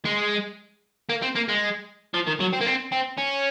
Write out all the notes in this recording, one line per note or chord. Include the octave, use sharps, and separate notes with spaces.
G#3
A#3
C4
A#3
G#3
F3
D#3
F#3
C4
A#3
C4
C4
C#4